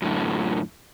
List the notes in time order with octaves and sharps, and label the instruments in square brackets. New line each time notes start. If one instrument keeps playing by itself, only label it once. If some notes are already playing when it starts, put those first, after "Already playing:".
[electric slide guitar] F#2 A2 D3